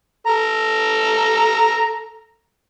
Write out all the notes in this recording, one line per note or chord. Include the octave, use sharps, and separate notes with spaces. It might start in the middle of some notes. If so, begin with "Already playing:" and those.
A4 A#5